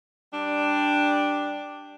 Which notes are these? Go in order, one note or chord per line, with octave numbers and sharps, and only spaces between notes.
G3 D4